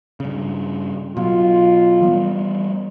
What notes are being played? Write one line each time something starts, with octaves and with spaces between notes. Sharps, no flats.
G2 C#3
B2 F#3 F4
E3 G3 B3